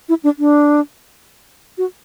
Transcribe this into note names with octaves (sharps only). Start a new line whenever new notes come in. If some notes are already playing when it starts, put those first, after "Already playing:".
E4
D4
D4
F#4